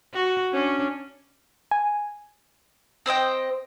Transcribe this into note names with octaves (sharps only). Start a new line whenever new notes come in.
F#4
C#4 D4
G#5
C4 C5 D#5 G5